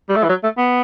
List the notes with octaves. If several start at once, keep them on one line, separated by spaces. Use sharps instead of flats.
G3
A3
E3
F#3
A3
B3